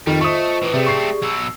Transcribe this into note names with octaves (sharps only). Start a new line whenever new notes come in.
F2 D#3 G3 F4
A3 F4 C5 D#5 C#6 D#6
A2 E3 B4
C3 A3 C4 G4 G#4 D5
C#6 C7
B2 F#3 E6